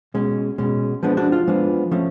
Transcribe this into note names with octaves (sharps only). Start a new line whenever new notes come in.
B2 G#3 C#4
B2 G#3 C#4
F3 G#3 B3 D4
D4 F#4
F4
F3 G#3 B3 D4
F3 A3 C#4